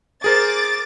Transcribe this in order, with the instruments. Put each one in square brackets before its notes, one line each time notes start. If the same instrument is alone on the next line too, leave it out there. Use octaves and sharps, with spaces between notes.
[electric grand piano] G#4 A#4 C5 [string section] D6 A6